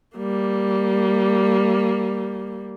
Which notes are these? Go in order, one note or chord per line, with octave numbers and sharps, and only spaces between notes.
G3 A#3